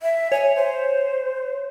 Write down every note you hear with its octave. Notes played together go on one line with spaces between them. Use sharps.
E5
C#5 G#5
C5